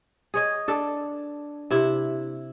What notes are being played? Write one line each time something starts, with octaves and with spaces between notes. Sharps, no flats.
G#4 C#5 D#5
D4 A4
C3 E4